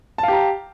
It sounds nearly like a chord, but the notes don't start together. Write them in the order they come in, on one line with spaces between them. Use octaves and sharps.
A5 F5 G4 A#5